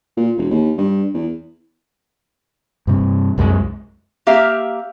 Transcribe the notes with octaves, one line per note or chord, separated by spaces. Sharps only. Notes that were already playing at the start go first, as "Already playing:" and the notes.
A#2
E1
D#2
G2
E2
G2 C3
C2 F#2 F3 G#3
A#3 G4 E5 F5